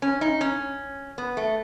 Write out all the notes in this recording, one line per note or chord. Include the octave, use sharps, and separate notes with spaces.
C#4
D#4
C#4
B3
A3